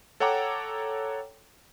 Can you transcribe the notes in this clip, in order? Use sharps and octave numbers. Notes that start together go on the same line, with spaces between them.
A4 C#5 F#5 G5 A#5 D6